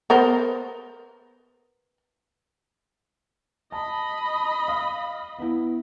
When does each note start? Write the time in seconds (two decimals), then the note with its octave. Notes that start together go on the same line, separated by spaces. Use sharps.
0.10 B3 A#4 C5
3.72 D#5 A5 B5
4.68 F5
5.39 B3 E4